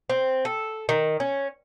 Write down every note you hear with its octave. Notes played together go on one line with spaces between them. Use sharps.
C4
A4
D#3
C#4